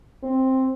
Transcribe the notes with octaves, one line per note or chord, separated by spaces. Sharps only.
C4